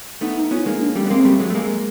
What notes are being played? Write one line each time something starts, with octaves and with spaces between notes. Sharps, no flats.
A3 B3 D#4
D#4
B3 C#4 F4
G#3 A#3 D#4
D4
G3 A3 C#4
B3
G#3 A#3 C4
G3 A3
F#3 G#3
A3
G#3 A#3